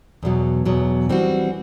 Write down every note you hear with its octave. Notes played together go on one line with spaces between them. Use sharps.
E2 B2 F#3
E2 B2 F#3
E3 G3 C4 F#4